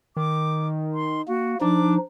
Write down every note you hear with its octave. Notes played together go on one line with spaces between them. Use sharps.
D#3 D6
C6
A#3 F#4
F3 D4 D#4 D6